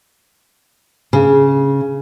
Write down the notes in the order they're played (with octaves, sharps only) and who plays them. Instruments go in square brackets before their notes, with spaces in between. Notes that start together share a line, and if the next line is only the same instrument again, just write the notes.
[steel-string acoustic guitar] C#3